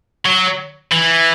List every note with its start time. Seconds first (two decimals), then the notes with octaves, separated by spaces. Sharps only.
0.26 F#3
0.92 E3